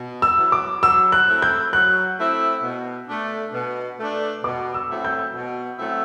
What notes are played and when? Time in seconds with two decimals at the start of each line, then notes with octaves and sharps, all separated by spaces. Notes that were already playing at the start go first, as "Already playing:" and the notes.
Already playing: B2
0.22 E6
0.37 F#3 B3 E4
0.52 D6
0.82 F#3 E6
1.12 F#6
1.28 A3 C4 E4
1.42 G6
1.73 F#3 F#6
2.17 A3 C4 E4
2.63 B2
3.09 A3 D4
3.54 B2
3.99 A3 D4
4.44 B2 D6
4.74 E6
4.89 F#3 A3 C4 E4
5.05 G6
5.35 B2
5.79 F#3 A3 C4 E4